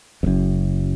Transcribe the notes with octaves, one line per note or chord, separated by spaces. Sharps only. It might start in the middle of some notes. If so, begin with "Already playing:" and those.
F2
F#1 F#2